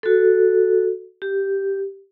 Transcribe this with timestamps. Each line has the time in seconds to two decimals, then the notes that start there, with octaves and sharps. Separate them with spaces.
0.03 F#4 A4
1.22 G4